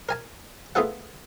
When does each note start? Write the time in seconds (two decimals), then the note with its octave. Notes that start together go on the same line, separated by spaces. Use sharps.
0.09 A#4 G#5 A5
0.75 A3 B3 F4 G#4 A4 F#5